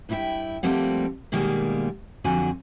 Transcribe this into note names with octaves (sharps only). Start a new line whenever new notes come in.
G2 D#4 E4 F#4 E5 G5
F3 G3 A3 A#3 C4 F#5
B2 D#3 G3 G#3 A#3
F2 D3 F#3 F#4 G#5